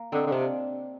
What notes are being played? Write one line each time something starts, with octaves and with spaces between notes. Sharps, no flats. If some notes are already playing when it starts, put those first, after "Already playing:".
Already playing: A#3
D3 C4 D#4
D3
C3 D4 F4